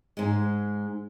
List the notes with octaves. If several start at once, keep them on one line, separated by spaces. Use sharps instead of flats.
G#2 G#3